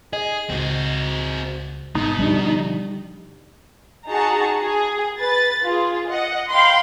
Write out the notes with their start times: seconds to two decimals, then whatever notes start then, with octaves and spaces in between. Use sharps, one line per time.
0.13 G#4 D#5
0.50 C#2 C4 F#4
1.95 G#1 B2 D#4
2.19 D3 F3 G3 D4
4.08 D#4 F#4 G#4 A5 A#5
4.62 G#4
5.18 B4 A6
5.65 F4 G#4
6.09 D#5 F#5
6.50 F5 G5 B5 C6